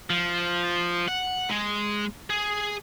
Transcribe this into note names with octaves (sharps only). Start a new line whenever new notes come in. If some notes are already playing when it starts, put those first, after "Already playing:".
F3
F#5
G#3
G#4